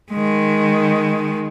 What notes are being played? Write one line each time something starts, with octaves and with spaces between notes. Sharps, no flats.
D#3 G#3